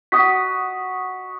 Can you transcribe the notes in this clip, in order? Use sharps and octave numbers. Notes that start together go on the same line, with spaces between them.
F#4 D#5 D#6 B6